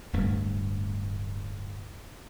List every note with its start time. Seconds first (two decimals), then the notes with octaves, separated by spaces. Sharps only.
0.13 D1 G2 A3